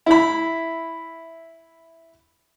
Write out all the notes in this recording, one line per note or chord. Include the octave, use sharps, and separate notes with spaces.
E4 B5